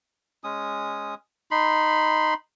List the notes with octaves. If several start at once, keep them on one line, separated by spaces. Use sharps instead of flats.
G#3 C#4 D#6
D#4 B5 C6